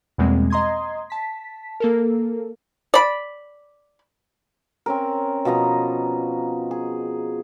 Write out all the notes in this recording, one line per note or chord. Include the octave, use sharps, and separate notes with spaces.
E2 B2 G3 G#3 A#3 C4
D#5 A#5 C6 D#6 G#6
A5 B6
A#3 A4 A#4
D5 B5
C4 C#4 A#4
B2 F3 D#5 A#5
G#4